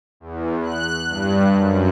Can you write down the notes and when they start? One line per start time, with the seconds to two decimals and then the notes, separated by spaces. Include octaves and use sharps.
0.20 E2
0.63 F#6
1.08 G2
1.53 F#2